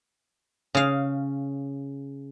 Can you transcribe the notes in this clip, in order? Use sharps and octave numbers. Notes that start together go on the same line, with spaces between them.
C#3 F5